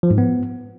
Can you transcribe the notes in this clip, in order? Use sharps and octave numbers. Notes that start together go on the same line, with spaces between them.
F3
G#2
B3